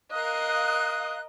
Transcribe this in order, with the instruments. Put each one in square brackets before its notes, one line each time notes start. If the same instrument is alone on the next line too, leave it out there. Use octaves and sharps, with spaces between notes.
[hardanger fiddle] A#4 D#5 [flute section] F5 D#6 F#6